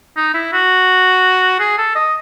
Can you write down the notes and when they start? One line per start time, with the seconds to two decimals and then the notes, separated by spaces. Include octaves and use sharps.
0.17 D#4
0.34 E4
0.53 F#4
1.60 G#4
1.78 A4
1.95 D#5